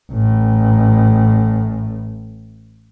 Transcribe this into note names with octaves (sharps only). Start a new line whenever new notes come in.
A1 A2